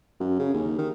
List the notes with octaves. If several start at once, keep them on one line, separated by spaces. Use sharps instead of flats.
F#2
C#3
D#2
D#3